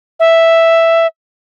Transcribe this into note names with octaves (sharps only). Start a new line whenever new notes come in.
E5